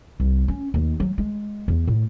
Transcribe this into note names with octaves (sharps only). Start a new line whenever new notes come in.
C2
C#4
D#2
F#3
G#3
E2
A2